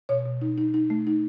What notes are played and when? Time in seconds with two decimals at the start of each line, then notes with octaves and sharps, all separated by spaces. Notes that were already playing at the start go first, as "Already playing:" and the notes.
0.09 B2 C#5
0.25 B2
0.42 D#4
0.58 D#4
0.74 D#4
0.90 A3
1.07 D#4